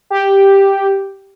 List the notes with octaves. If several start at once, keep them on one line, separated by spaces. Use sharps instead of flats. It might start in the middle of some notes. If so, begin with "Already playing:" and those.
G4